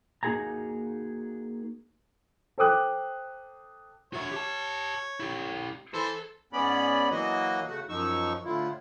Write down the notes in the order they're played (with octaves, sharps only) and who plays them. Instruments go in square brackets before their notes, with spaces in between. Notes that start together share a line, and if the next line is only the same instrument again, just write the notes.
[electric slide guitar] A#3 D#4 F#4 G#4 G#5 A#5
[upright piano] A4 C5 G5 D6 D#6 F#6
[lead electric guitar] F#4 E5 [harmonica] C#5
[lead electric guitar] G4 A5
E4 G4
[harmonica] E3 C5 [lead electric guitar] A4
[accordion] G#2 B3 C#4 D5 B5
E3 F#3 A#3 F#4 D#5
C#3 A3 F#4 F#5
F#2 F3 D#4 C#6 E6
A2 D3 E4 F4